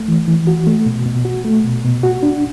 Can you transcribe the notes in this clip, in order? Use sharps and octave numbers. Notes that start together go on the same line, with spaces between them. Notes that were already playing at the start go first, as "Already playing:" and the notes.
Already playing: A3
E3
E3
F#4
A3
B2
B2
F#4
A3
B2
B2
F#4
D4